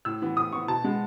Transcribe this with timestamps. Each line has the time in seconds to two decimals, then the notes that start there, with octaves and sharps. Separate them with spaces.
0.05 A2 E6
0.22 E3 B3
0.37 A2 D#6
0.52 E3 B3 C#6
0.68 B2 A5
0.84 G#3 B3